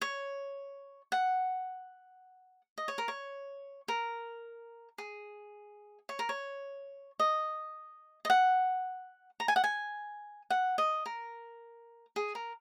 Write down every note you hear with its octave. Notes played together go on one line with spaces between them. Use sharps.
C#5
F#5
D#5
C#5
A#4
C#5
A#4
G#4
C#5
A#4
C#5
D#5
D#5
F#5
A#5
G#5
F#5
G#5
F#5
D#5
A#4
G#4
A#4